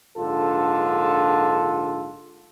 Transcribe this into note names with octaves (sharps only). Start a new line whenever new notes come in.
A#1 G#2 D3 F4 A4